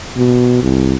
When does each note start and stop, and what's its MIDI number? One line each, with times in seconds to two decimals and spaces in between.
0.17 0.58 47
0.62 0.94 36